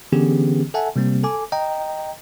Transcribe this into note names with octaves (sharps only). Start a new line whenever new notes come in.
D3 E3 B3 C#4 G4 G#4
A4 E5 F#5 G#5 A5
C3 G3 A#3 C4
A4 G#5 D6
D#5 G5 A#5